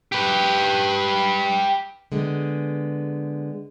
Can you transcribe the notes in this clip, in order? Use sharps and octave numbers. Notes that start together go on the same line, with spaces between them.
G4 B4
D3 G#3 B3